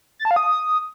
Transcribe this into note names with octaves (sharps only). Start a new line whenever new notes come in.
A6
A5
F5
D#6